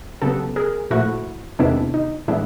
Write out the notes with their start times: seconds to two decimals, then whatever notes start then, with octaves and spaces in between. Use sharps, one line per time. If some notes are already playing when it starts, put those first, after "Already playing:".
0.22 C#3 F#3 B3 G4 A4
0.56 G#4 A#4
0.90 A#2 F3 A3 E4 F#4
1.59 E2 C3 D#3 G#3 B3 D4 E4
1.94 D#4
2.28 A2 E3 G#3 B3 D4 E4